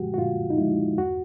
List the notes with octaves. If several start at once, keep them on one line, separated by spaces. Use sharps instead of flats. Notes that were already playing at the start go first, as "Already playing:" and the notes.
Already playing: A#2 F3 G#3 F#4 G4
F#4
A#2 F4
D#4
F3 G#3 E4
E2 F#4